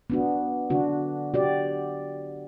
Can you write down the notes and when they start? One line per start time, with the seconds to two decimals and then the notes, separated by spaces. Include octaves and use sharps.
0.10 B3 D4 F#4
0.70 D3 D4 F#4
1.34 F#4 G4 D5